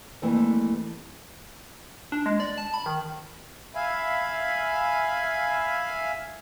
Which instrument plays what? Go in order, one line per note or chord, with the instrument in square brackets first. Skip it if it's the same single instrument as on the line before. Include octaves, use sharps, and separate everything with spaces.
[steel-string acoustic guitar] F2 E3 G3 A3 A#3
[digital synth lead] D4
G#3
D5
A5
B5
D#3
[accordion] E5 F5 G#5 B5